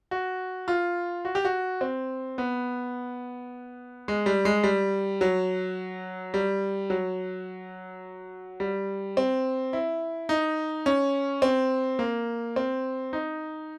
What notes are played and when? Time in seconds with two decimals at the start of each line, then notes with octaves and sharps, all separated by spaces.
0.11 F#4
0.68 F4
1.25 F#4
1.35 G4
1.45 F#4
1.81 C4
2.38 B3
4.08 G#3
4.26 G3
4.45 G#3
4.64 G3
5.21 F#3
6.34 G3
6.90 F#3
8.60 G3
9.17 C4
9.73 E4
10.29 D#4
10.86 C#4
11.42 C4
11.99 A#3
12.56 C4
13.13 D#4